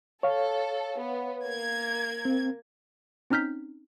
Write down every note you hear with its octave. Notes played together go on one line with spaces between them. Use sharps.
A4 C#5 F5
B3
A#3 G#6
C4
C4 C#4 D#4 F6 G6 B6